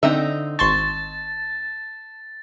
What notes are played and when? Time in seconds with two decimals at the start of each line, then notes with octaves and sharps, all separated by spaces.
0.03 D3 C4 D#4 E5
0.59 G#1 A5 C6 C#6 A6